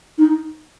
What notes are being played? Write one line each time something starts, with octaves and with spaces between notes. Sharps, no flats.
D#4